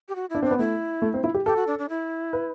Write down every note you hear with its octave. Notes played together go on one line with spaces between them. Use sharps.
G4
F#4
D4 E4
C4 D4
B3
A3 E4
A3
C4
E4
G4
G4 A4
F#4
D4
D4
E4
B4